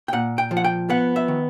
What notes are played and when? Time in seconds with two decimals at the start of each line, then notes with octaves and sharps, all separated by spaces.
0.08 G5
0.13 A#2 F#5
0.38 G5
0.51 F3
0.57 F#5
0.64 G5
0.90 B3 F#5
1.16 E5
1.28 D#3